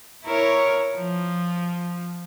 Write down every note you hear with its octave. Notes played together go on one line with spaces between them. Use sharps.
E4 A#4 C#5
F3